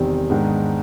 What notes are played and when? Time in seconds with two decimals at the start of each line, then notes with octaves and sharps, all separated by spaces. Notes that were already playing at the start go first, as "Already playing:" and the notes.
Already playing: E2 C3 D#3 G3 C4
0.30 G#2 D#3 G#3 B3 D4